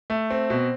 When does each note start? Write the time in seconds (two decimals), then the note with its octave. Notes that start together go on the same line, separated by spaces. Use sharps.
0.10 A3
0.31 C4
0.50 B2